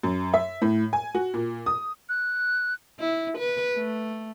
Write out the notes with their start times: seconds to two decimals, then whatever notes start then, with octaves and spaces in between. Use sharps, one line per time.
0.03 F#2
0.34 E5
0.62 A2
0.93 G#5
1.15 F#4
1.34 A#2
1.66 D#6
2.09 F#6
3.00 E4
3.38 B4
3.77 A3